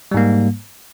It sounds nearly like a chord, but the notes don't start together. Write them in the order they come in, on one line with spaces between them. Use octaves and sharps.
G3 G#2 A#3